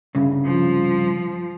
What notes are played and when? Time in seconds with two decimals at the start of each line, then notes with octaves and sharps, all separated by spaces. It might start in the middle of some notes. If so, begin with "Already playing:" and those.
0.15 C2 G2 C#3
0.45 F3